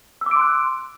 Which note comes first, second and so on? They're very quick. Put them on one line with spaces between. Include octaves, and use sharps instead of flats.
E6 D6 D7 C6 F#6